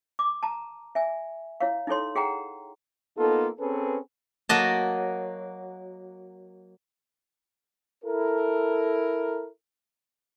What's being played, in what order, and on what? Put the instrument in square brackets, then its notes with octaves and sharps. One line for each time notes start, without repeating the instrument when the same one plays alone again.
[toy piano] D6
A5 A#5
E5 G#5
E4 C#5 F5
D#4 E4 A4 C#5 C6
G#4 F#5 G5 A#5
[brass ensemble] A#3 B3 D#4 F4 A4
C4 C#4 G#4 A4 B4
[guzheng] F#3 A#3 F#4 D#5 A5
[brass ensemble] E4 A4 A#4